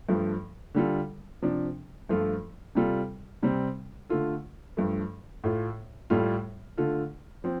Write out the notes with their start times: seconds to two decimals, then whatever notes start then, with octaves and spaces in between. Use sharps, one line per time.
0.09 G2 F3 A3
0.74 D3 G3 F4 A4
1.42 C3 F3 D4
2.09 G2 F3 A3 F4 A4
2.75 C3 G3 F4 A4
3.43 C3 G3 C4
4.10 D3 A3 F4 A4
4.77 G2 F3 A3
5.44 A2 A3 F4
6.10 A2 G3 F4 A4
6.77 D3 A3 F4 A4
7.44 F3 C4